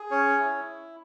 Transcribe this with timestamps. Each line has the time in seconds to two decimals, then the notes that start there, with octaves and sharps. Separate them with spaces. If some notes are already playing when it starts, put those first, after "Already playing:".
Already playing: G#4
0.11 C#4 C#5
0.38 E4